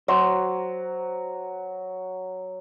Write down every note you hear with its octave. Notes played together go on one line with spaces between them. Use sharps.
F#3 C5